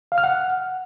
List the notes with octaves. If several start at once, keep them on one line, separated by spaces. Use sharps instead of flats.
F5
F6
F#5